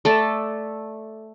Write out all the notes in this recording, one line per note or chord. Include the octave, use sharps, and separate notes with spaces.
A3 A4 D5